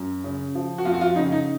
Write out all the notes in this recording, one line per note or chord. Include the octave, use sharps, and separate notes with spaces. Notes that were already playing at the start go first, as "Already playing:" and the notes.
Already playing: F#2
C#3
F3
F#4
F2 F4
F#4
F4
C#3 D#4
D#4